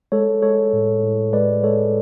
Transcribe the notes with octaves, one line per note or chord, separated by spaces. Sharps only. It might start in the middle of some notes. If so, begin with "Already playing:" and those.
G#3 A4 C#5
G#3 A4 C#5
A2
A2
G#3 B4 D5
G#3 A4 C#5